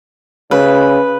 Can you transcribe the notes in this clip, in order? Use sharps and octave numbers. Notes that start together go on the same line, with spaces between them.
C#3 B4